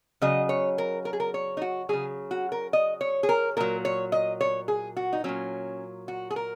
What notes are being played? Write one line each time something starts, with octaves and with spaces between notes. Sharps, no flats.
C#3 F#3 D#5
C#5
A#4
A#4
G#4
A#4
C#5
D#4
F#4
C#3 F#3 G#4
F#4
A#4
D#5
C#5
G#4
A#4
A#2 F#3 A#4
C#5
D#5
C#5
G#4
F#4
D#4
A#2 F#3 C#4
F#4
G#4
A#4